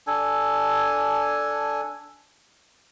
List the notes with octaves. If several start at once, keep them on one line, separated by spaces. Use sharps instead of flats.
D4 A4 G#5